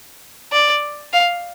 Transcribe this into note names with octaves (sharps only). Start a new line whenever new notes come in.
D5
F5